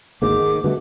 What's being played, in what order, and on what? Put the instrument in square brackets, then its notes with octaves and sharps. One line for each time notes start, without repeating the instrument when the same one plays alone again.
[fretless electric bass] G#1 D2 A#3 [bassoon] G#2 [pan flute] D6
[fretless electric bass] D#3
[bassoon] B2 [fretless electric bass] D3 G3 A3